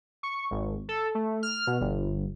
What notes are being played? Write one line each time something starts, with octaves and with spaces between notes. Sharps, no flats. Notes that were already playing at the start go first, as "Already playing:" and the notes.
C#6
G#1
A4
A3
F6
B2
G1